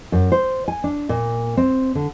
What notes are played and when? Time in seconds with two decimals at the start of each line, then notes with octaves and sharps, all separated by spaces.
0.12 F#2
0.32 C5
0.68 G#5
0.84 D4
1.09 A#2
1.57 C4
1.95 D3